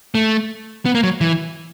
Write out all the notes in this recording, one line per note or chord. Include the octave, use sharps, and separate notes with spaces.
A3
B3
A#3
F#3
E3